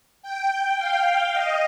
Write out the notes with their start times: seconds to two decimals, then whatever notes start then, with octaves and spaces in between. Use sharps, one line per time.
0.22 G5
0.78 F5
1.33 D#5